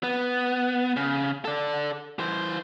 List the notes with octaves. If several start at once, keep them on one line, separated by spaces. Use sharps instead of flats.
B3
C#3
A4 D5
E3 C5